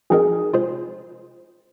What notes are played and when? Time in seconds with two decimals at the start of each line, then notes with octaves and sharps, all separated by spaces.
0.10 F3 C4 D#4 G#4 A#4 D#5
0.53 C3 G#3 F4 G#4 C5